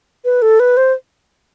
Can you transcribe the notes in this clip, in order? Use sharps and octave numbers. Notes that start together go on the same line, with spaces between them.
B4
A4
B4
C5